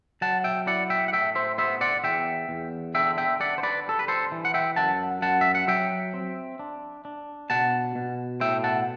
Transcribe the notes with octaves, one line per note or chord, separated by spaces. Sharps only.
F#3 F#5 A5
E5 G5
E4 D5 F#5
E5 G5
F#5
A2 E5 G5
C5 E5
B3 C5 E5
D5 F#5
E2 E5 G5
E2
D3 E5 G5
E5 G5
D3 D5 F#5
C5
B4 D5
G3 A4
B4
A4 C5
E3
F#5
E5 G5
F#2 F#5 A5
F#2 F#5 A5
E5
F#5
F#3 E5 G5
C4
D4
D4
B2 F#5 A5
B2
A2 E5 G5
F#5 A5